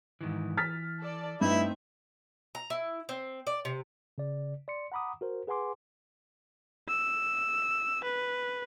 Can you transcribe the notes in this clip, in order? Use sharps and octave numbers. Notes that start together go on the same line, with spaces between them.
G#2 D#3 E3
E3 F6 A6 B6
A4 D5
G2 A3 C4 D#4 E4 E5
A#5
E4
C4
D5
C3
C#3 D5
D5 C6 C#7
F#5 A#5 B5 D6 D#6
F#4 A#4 C5
G#4 B4 F#5 G#5 C6 D6
E6
B4